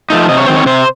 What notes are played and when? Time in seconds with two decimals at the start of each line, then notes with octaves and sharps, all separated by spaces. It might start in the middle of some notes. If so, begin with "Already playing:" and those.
0.10 F3 A3 D#4
0.29 C3 D#5
0.38 C#5
0.47 D#3 F#3 C4 C5
0.56 C#5
0.66 C3 C5